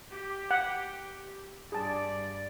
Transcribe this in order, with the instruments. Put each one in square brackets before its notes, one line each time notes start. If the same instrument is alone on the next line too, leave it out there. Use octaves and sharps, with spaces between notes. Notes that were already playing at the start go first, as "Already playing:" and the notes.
[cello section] G4
[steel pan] F#5
[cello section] G2 D5 [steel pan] G#4 A5